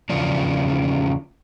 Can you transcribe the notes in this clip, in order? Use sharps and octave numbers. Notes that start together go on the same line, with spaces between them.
E2 C#3 F3 C#4 D4